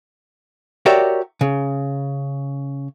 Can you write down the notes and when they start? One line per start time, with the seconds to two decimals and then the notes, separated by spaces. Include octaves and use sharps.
0.86 F#4 G4 A#4 C#5 D5 E5
1.41 C#3